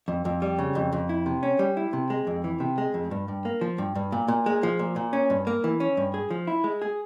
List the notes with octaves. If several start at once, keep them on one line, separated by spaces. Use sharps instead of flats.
F2
F2
G3
C#3
F2
F2
E4
C3
C#4
G3
E4
C3
G#3
F2
E3
C3
G#3
F2
G2
G2
A#3
F3
G2
G2
A#2
A#2
G#3
F3
A#2
A#2
C#4
G2
A#3
E3
C#4
G2
G#4
F3
E4
G#3
G#4